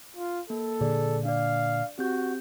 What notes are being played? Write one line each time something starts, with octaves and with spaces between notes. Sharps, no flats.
F4
A#3 A4
A#2 D3 G#4 D5
D4 D5 F5
C4 F#4 G4 G6